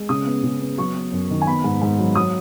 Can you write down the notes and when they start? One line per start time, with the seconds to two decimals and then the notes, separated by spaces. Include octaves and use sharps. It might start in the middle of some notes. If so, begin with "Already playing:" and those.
Already playing: G#3
0.09 C#3 D#6
0.26 B3
0.43 C#3
0.61 B3
0.78 F#3 C#6
0.95 B3
1.12 F#2
1.30 D#3
1.42 G#5
1.47 B3 B5
1.64 G#2
1.82 G#2
1.99 F#3
2.15 F#3 D#6